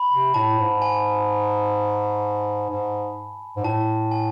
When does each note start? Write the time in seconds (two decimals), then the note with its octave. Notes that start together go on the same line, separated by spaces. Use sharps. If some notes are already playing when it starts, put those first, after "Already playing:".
Already playing: B5
0.11 C3
0.34 A2 A5
0.59 G#2
0.82 G#5
2.70 G#2
3.56 G#2
3.64 A2 A5
4.11 G#5